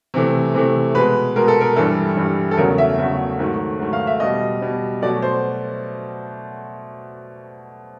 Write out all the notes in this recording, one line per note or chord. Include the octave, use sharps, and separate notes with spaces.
C3 E3 A3
C3 E3 A3
B2 G#3 B4
B2 G#3 A#4
A4
A#4
G2 E3 G3 A4
G2 E3 G3
A4
E2 C#3 F#3 A3 A#4
E5
E2 C#3 F#3 A3
G#2 D#3 F#3 A3
G#2 D#3 F#3 A3
F5
E5
B2 G3 D#5
B2 G3
B2 F#3 A3 D5
C5